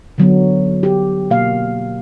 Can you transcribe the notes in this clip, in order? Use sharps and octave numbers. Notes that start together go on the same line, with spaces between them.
D3 F#3 B3
G4
B2 A#3 F5